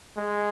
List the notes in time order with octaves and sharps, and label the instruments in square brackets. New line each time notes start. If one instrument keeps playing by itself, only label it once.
[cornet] G#3